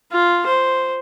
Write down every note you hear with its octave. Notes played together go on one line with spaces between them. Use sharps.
F4
C5